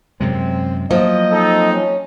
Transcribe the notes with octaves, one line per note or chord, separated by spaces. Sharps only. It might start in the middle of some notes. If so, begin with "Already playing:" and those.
F#2 C3 G#3 C4
F3 F#3 A#3 D#5
C4 D#4 A4
C#4